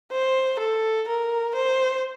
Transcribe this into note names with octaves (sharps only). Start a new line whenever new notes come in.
C5
A4
A#4
C5